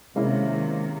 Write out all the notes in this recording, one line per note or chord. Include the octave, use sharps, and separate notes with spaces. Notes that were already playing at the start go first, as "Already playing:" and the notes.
C3 D#3 G#3 A#3 C#4 E4